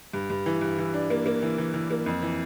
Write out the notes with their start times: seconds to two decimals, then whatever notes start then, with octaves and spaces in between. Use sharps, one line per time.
0.13 G2
0.30 G2
0.46 E3
0.61 G2
0.78 E3
0.94 D4
1.10 A#3
1.26 A#3
1.43 E3
1.58 E3
1.74 E3
1.91 A#3
2.06 F2
2.22 E3